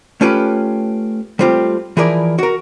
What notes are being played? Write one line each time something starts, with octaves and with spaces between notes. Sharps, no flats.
A3 C#4 F4 G4 B4
G3 A3 C4 F4 G4
E3 F3 E4 G#4 A#4 D5
F#4 A#4